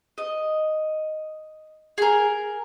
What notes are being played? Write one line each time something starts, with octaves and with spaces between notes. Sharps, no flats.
D#5
G#4 A#4